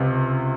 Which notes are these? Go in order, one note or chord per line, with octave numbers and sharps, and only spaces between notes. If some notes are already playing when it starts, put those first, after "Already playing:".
Already playing: C#2 C3